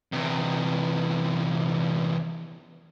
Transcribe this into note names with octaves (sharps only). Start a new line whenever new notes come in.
E2 C3